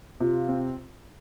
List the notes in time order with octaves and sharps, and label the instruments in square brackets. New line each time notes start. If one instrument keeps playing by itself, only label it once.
[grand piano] C3 [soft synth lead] F4
[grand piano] C4